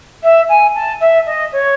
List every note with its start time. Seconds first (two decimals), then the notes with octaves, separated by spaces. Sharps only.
0.23 E5
0.49 G#5
0.75 A5
1.00 E5
1.26 D#5
1.52 C#5